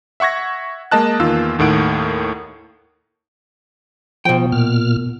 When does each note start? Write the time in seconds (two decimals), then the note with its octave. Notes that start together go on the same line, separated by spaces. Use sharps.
0.20 E5 F#5 C#6 G#6 A#6
0.91 G#3 A#3 D#5 A5 F#6
1.20 E2 D#3 A#3 F4 E6
1.59 D#2 A2 D#3 F#5 D7
4.25 B2 F3 G5
4.52 A#2 F6